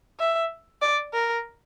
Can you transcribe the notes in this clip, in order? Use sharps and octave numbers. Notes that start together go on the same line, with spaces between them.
E5
D5
A#4